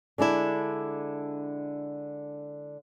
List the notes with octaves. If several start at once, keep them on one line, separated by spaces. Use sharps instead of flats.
D3 G#3 D4 E4